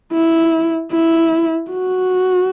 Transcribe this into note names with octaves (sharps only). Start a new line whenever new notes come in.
E4
E4
F#4